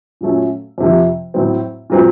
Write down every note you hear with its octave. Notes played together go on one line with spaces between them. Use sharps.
A#2 F#3 A3 C#4
F2 C3 F3
A2 F#3 C4
A#2 F#3 C4